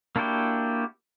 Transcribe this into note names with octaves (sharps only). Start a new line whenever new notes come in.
A#3 D4 E4 F#4 G4